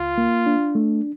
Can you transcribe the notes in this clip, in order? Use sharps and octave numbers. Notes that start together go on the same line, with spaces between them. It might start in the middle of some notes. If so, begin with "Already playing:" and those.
Already playing: C#2 F4
A#3
D4
A3